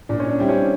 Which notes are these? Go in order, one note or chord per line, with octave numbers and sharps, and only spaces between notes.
A#2 D4
C#4
D4
G3 C4 E4 G4
C#4